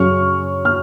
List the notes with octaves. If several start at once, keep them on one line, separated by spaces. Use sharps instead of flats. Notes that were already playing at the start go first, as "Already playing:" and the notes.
Already playing: F#2 C#3 F#3 C#6 F6
F6